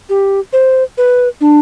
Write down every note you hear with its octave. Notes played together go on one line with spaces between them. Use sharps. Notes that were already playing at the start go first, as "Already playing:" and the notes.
G4
C5
B4
D4